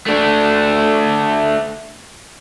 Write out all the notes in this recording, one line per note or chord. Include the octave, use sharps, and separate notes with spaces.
A3 D4